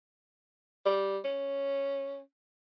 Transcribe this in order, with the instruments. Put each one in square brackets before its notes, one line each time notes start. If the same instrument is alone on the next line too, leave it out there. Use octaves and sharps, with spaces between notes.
[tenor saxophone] G3
C#4